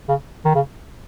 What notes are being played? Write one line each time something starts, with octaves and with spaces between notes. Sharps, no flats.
C#3
D#3
C#3